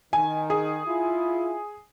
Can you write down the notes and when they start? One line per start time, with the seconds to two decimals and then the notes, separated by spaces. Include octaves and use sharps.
0.13 D#3 G#5
0.50 G#4
0.87 E4 F4